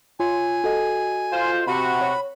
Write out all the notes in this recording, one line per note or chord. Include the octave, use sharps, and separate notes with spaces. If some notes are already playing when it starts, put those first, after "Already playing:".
F4 C#5 G#5 C6
F#4 A4 D#5
F4 C5
C3 F#4 B5
C#5